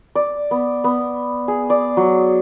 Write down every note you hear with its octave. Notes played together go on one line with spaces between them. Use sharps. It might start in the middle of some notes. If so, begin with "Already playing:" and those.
D5
B3
B3
G#4
D5
F#3